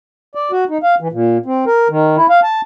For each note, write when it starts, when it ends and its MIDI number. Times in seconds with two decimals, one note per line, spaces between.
0.35 0.51 74
0.51 0.64 66
0.69 0.78 63
0.83 0.95 77
1.00 1.08 52
1.12 1.38 46
1.46 1.65 60
1.67 1.88 70
1.90 2.16 51
2.17 2.27 64
2.30 2.40 77
2.43 2.61 81